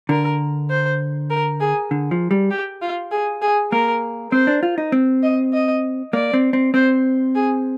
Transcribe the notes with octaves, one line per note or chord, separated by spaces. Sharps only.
D3 A#4
C5
A#4
G#4
D3
F3
G3
G4
F4
G#4
G#4
A#3 A#4
C4 C5
D4
F4
D#4
C4
D#5
D#5
A#3 D5
C4
C4
C4 C5
G#4